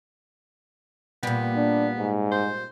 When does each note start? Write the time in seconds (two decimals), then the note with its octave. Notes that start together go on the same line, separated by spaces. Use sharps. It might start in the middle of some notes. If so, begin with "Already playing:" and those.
1.23 A#2 G3 B3
1.56 D4
1.99 G#2
2.32 C5